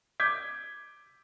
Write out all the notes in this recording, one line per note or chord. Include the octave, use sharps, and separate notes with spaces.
D6 G6 G#6 B6